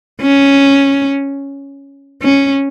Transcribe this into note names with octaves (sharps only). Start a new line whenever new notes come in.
C#4
C#4